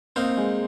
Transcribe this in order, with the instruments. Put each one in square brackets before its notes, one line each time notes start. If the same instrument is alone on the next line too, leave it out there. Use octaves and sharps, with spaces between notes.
[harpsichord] A#3 D#4 C5 F5 [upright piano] C4
[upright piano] G#3